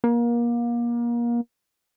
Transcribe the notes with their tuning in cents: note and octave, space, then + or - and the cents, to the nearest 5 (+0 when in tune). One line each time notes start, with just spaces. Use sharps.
A#3 +30